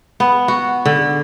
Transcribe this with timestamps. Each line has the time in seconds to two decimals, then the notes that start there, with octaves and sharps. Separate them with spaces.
0.20 B3
0.48 F#4
0.85 D3